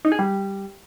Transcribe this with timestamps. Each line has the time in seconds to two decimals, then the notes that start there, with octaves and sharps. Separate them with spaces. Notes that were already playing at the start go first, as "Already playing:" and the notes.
0.05 D#4
0.12 G#4
0.19 G3